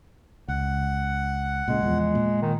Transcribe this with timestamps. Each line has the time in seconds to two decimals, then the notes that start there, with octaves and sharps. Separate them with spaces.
0.48 C#2 F#5
1.68 A#2 C#3 G#3
1.82 E2 F3
2.15 A#2
2.42 D#3